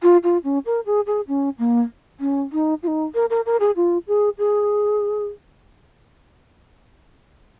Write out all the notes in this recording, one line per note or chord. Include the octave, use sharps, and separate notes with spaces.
F4
F4
C#4
A#4
G#4
G#4
C#4
A#3
C#4
D#4
F4
D#4
A#4
A#4
A#4
G#4
F4
G#4
G#4